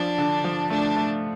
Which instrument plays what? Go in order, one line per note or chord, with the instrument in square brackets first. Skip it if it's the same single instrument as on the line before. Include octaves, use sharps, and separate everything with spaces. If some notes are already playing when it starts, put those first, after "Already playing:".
Already playing: [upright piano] F3 [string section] D4
[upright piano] D3
F3
[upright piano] A3 [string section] D4
[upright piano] A3